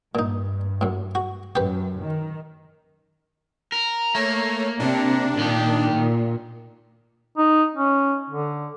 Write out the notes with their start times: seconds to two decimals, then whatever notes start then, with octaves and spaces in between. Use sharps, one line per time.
0.15 G2 A#2 D#4
0.81 F#2 A2
1.15 F#4
1.56 F#2 G4 B4
2.00 D#3
3.72 A#4
4.15 A3 A#3 C#5
4.80 C3 D4
5.39 A#2 D#3 G4
5.93 A#2
7.38 D#4
7.74 C#4
8.30 D3